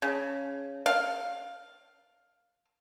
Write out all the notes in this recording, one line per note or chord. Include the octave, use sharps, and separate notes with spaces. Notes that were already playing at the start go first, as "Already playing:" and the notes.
C#3
F5